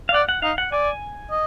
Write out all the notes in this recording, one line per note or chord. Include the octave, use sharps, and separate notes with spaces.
F5
D5 F#5
F#5
D#4 F5
F#5
D5 G#5
D#5